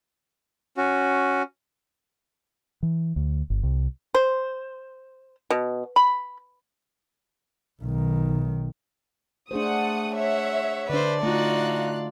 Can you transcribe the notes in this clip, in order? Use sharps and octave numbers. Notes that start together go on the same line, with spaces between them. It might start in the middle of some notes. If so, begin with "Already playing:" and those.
C#4 F#4
E3
D2
G1
C2
C5
B2
B5
B1 D#3
A3 D4 G#4 C5 F#5 D#6
C#5 E5 F#5
D3 D4 B4 C5 D5
A3 D#4 F4 F#4 F5 F#6